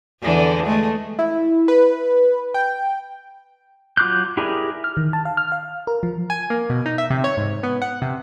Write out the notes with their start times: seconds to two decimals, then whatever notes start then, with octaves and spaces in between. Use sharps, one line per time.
0.21 E2 D3 E3
0.66 G#3 A3
1.19 E4
1.68 B4
2.54 G5
3.97 F#3 F4 D6 F#6 G6
4.37 E4 G4 G#4 A#4 D5
4.84 F6
4.97 D#3
5.13 A5
5.25 F5
5.37 F6
5.52 F5
5.87 A#4
6.03 F3
6.30 G#5
6.50 A#3
6.69 B2
6.86 D#4
6.98 E5
7.10 C3
7.24 C#5
7.37 G#2
7.63 B3
7.82 F#5
8.02 C3